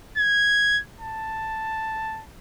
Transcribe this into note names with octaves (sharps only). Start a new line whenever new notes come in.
G#6
A5